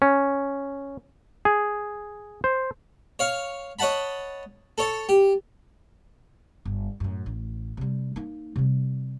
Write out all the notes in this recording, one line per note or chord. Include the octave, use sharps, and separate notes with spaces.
C#4
G#4
C5
C#5 F5 C#6
C#5 D#5 F#5 A5 B5
A4 C#5 A5
G4
G1
F#2 A2
A1
C3 G3
A#3 D#4
C3 G3